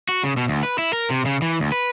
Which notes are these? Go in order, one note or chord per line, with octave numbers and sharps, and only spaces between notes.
F#4
C#3
B2
D2
B4
E4
A#4
C3
C#3
E3
D2
B4